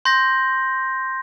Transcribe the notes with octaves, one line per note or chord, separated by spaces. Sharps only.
C6 G6 A#6